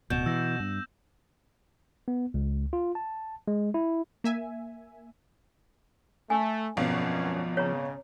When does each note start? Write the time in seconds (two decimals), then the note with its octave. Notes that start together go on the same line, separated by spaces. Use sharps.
0.10 D1 B2 G6 E7
0.26 E3 E6 A#6
0.60 G2
2.08 B3
2.34 C#2
2.73 F4
2.95 A5
3.48 G#3
3.74 E4
4.24 A#3 E5 G#5
6.30 A3 G#5
6.77 G#1 F#2 B2 F3 C#4 F5
7.57 C#3 C#5 A#5